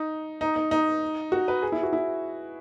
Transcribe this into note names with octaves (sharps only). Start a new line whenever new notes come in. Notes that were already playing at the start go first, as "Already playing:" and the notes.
Already playing: D#4
D#4
D#4
D#4
F#4
B4
G#4
E4
F#4
E4